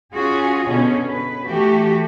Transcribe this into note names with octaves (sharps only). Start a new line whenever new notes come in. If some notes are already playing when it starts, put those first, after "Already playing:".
C#4 F4 F#4 G#4
B2 D3 C#4
B4
E3 A3 F#4 G4